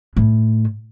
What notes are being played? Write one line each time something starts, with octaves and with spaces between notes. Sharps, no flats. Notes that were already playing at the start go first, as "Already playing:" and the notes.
A2